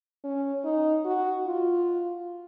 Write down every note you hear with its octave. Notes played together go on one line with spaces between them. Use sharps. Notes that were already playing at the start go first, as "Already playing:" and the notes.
C#4
D#4
F#4
F4